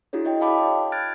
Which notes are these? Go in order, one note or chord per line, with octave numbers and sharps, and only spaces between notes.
D4 E4 F#4 G#4 C#5
C#5 D#5 G5
D#5 F5 G5 A5 B5 D6
F6 F#6 G#6 A6 D7